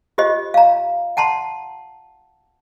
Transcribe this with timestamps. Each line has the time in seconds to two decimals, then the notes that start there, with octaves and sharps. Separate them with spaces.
0.18 F4 G4 C5 D#5
0.54 F5 A#5
1.17 F#5 A5 A#5 C6